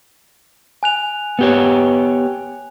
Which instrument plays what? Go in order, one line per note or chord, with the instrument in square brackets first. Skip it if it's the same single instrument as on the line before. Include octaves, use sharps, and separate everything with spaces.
[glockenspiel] G#5 F#6 F7
[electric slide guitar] B3 G4 C#5